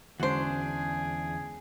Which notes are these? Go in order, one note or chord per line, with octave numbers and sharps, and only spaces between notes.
E2 D3 G#3 C#4 D4 F#4 G#4 C5